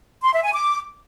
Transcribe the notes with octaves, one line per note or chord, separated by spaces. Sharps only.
C6
E5
G#5
D6